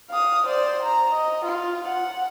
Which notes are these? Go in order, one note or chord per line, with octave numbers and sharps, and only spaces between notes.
F5 D#6
C5 D5
A#5
D#5
F4
F#5